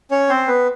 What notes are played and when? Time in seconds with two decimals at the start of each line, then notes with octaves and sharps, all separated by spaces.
0.11 C#4 C#5
0.29 C4 C5
0.48 B3 B4